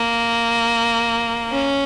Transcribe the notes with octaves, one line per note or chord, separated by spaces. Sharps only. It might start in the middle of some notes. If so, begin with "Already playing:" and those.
Already playing: A#3
C#4